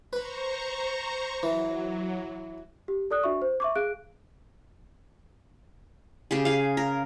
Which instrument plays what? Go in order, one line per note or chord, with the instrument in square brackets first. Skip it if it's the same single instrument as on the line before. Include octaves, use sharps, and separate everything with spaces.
[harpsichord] B4 B5 [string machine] C5 A#5 C#6
[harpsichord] E3 [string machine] F#3
[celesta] G4
A4 D5 D#6 F#6
D4 F#4 E5 C#6
C5
E5 C#6 D6
G#4 F5 F#6 D7
[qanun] C#3 G4 G#4
G#4 F5
A#4